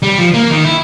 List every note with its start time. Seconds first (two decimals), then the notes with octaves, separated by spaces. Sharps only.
0.02 G3
0.18 F3
0.34 A#3
0.50 D#3
0.65 E4